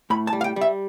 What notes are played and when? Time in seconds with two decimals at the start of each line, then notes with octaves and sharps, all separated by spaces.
0.10 A2 B5
0.27 A5
0.33 G3
0.41 F5
0.44 G5
0.56 G3
0.61 E5